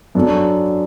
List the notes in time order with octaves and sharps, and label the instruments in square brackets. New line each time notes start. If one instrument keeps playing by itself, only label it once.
[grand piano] F#2 F#3 D4 A4